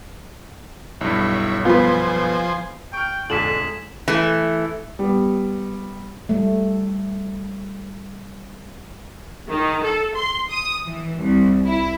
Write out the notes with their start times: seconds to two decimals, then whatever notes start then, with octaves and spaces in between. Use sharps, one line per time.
1.01 B1 G2 E4 C#5
1.65 F3 B3 F4 B4 C5 G#5
2.93 G5 C#6 F6
3.30 E1 F2 G#2 D3 G#4 B6 E7 F#7
4.08 E3 A3
4.99 G3 B3
6.29 G3 A3
9.49 D#3
9.84 A4
10.15 C6
10.50 D#6
10.87 E3
11.19 C2
11.65 E4